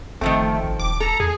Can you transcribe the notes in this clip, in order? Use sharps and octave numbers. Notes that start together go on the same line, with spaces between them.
G1 D#3 F3 A3 C4
G#1
D#1 D6
A4 A#5
E2 G#4